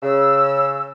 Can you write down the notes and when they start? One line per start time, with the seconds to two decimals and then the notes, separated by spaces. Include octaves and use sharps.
0.03 C#3 E6